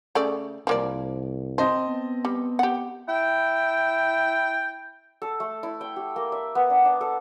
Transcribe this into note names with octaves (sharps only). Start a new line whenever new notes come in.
C#3 A3 D5
C2 F3 A#3 D5
C4 C5 D#5 A5
B3
G3
G4 F#5
E4 G5
A4
A3
E4
G5
G4
A#3
E5
B3
D4
D4
A4